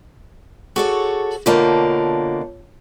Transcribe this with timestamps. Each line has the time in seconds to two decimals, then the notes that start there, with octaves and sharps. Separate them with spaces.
0.76 F#4 G#4 A4 C#5
1.46 B2 D3 A#3 F4 C#5 A5